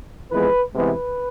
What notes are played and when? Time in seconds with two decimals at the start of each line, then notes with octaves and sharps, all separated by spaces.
0.30 F2 E3 G#3 B3 B4
0.75 C2 C3 E3 G#3 B3 B4